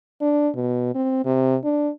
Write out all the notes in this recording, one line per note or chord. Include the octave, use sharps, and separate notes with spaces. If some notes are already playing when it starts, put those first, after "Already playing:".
D4
B2
C4
C3
D4